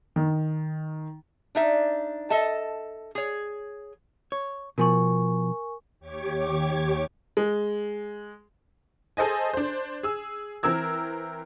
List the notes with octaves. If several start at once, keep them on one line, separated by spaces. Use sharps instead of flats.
D#3
D4 D#4 E5
A4 D#5 E5 A5
G#4 C#5
C#5
B2 F3 A#4 G#5 C#6
D#2 G4 C#5 D6 G#6
G#3
G#4 A4 C5 D#5 G#5
D4 C5
G#4 E6
E3 C4 A#4 E6 G#6